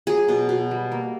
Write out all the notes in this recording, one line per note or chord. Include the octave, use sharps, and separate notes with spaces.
F#3 G#4
B2
B2
G3
A#3